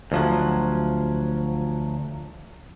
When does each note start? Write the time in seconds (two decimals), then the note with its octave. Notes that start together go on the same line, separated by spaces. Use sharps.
0.12 D2 F3 F#3